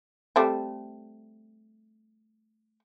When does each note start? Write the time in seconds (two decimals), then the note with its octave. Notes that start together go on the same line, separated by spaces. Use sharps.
0.36 G3 A3 C4